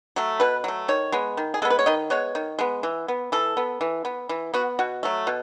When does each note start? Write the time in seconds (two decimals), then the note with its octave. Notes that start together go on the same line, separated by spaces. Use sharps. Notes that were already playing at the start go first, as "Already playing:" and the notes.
0.16 F#3 A3
0.40 B2 B4
0.64 F#3 A3
0.88 D#3 C#5
1.12 G#3 B3
1.37 D#3
1.54 G#4
1.62 G#3 B3 A4
1.70 B4
1.79 C#5
1.86 D#3 D#5
2.10 G#3 B3 C#5
2.35 D#3
2.59 G#3 B3
2.83 E3
3.08 B3
3.32 E3 A4
3.57 B3
3.81 E3
4.05 B3
4.29 E3
4.54 B3 F#4
4.79 B2 F#4
5.03 F#3 A3
5.27 B2